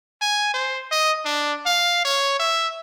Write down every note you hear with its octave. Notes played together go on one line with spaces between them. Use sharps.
G#5
C5
D#5
D4
F5
C#5
E5